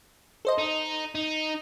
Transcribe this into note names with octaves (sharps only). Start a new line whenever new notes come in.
A4 C5 D#5
D#4
D#4